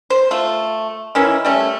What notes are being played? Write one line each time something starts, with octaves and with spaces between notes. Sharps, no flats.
C5
A3 F4
D#3 E3 C#4 E4
G3 A3 C#4